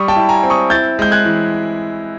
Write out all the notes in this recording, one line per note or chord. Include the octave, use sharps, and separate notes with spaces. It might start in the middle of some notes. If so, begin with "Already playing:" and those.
Already playing: G3 C#6 D#6
G5 A5
E4
G#5 A#5
C4
C#6 D#6
E4 G6 A6
G#3 G6
F#6 G#6
E3